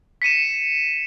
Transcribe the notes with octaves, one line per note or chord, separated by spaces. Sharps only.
B6 C#7 D#7 E7